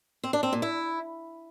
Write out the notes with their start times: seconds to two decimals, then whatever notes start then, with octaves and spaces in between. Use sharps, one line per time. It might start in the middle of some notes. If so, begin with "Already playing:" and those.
0.24 C4
0.33 D4
0.43 C4
0.53 A#2
0.62 E4